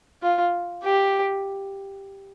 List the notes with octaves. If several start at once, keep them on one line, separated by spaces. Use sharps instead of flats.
F4
G4